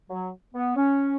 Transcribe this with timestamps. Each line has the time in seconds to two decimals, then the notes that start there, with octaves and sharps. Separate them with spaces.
0.10 F#3
0.54 B3
0.76 C#4